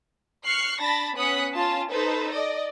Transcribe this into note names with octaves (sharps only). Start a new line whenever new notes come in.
C#6 F6 F#6 C7
D4 A5 B5 A6 A#6
B3 C#4 D#6 F#6 B6 C#7
C#4 F4 A5
D#4 A4 B4 C5
D5 D#5